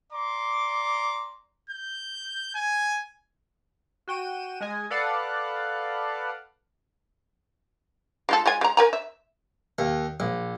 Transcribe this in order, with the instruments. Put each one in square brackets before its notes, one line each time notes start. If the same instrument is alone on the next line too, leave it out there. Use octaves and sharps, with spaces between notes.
[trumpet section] D5 A#5 C6 D6
[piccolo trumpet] G6
G#5
[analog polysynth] F#4 G5 D#7 E7
G#3 D#5 G#5
A4 B4 D5 F5 F#5
[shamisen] G#3 F4 A4
G#3 F4 G#5
G#3 A#5
A#4 G#5 A#5
E5
[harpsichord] D#2
A#1